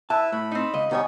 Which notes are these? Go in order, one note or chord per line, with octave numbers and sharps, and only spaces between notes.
E4 B4 E5 A5
A2 B5
C4 D#4
C#2 D#5
B2 G3 B3 D#4 C#5 G#5